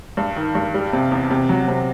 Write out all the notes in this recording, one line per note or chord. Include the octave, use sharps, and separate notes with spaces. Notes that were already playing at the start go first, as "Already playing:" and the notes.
G2
D#3
G2
G3
C3
E2
C3
F#3
C3